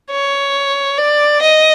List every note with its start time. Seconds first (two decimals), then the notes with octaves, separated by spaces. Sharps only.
0.11 C#5
0.98 D5
1.41 D#5